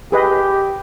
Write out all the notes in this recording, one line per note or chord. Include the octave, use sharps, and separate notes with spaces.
G4 G#4 B4 D#5